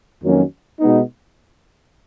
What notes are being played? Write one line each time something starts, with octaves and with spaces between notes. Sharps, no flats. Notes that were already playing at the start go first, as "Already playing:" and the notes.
F2 D#3 F#3 A#3 C#4
B2 G#3 B3 D#4